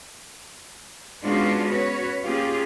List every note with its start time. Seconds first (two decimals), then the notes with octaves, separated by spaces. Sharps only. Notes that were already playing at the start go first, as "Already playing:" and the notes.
1.24 G#3 B3 C#4 D4 F4 F#4
1.69 C#4 F#4 B4 C#5
2.24 A#3 C#4 F4 G4 G#4